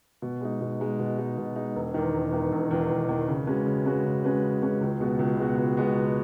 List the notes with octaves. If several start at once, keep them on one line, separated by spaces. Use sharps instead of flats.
B2
G#3 D#4
B2
G#3 D#4
B2
G#3 D#4
B2
G#3 D#4
E1
E2 D#3
E1
E2 D#3
E1
E2 D#3
E1
E2 D#3
C#3
G#3 C#4 F#4 B4
C#3
G#3 C#4 F#4 B4
C#3
G#3 C#4 F#4 B4
C#3
G#3 C#4 F#4 B4
C#2
B2 G#3 B3 F#4
C#2
B2 G#3 B3 F#4
C#2
B2 G#3 B3 F#4
C#2